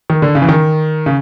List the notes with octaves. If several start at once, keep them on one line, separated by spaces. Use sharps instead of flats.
D#3
D3
C#3
E3
D#3
C#3